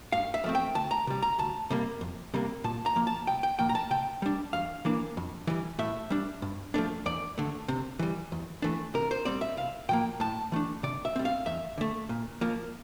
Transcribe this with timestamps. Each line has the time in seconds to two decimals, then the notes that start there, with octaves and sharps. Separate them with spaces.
0.12 G2 F5
0.34 E5
0.44 F3 A3 C4
0.55 G5
0.75 D2 A5
0.91 A#5
1.07 C3 G3
1.22 A#5
1.39 D2 A5
1.70 C3 G3 A#3
2.01 F2
2.34 C3 G3 A#3
2.64 A#2 A5
2.86 A#5
2.96 F3 A#3
3.07 A5
3.27 C2 G5
3.43 G5
3.59 A#2 F3 A#3 G5
3.69 A#5
3.75 A5
3.91 C3 G5
4.22 G3 D4
4.53 E2 F5
4.85 E3 A#3 D4
5.17 F2
5.47 E3 G3
5.79 A2 E5
6.10 G3 D4
6.42 G2
6.74 F3 A3 D4
7.06 E2 D5
7.38 D3 A3
7.68 C3
7.99 E3 G3
8.32 E2
8.62 E3 A3 D4
8.94 C3 A#4
9.11 C5
9.25 G3 C4 D5
9.41 E5
9.57 C2 F5
9.89 A#2 F3 A#3 G5
10.20 A2 A5
10.52 E3 A3 D4
10.83 C3 D5
11.05 E5
11.16 G3 C4
11.25 F5
11.46 E2 E5
11.78 D3 A3
12.09 A#2
12.41 F3 A#3